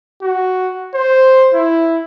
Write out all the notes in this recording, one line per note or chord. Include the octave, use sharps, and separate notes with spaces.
F#4
C5
E4